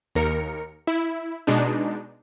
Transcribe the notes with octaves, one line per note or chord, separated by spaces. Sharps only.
D#2 A#4 C#7
E4
B2 G#3 D4 D#4